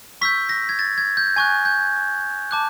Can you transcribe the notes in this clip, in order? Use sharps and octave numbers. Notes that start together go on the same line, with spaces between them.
C#6 E6 G6 B6
A#6
G#6
A6
G#6
G6
G#5 C#6 F#6 G#6
G6
A5 D6 F#6